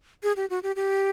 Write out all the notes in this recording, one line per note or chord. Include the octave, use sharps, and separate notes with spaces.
G#4
G4
F#4
G4
G4